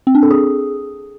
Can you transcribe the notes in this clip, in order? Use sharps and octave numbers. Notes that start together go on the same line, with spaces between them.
C4
D4
A4
G#4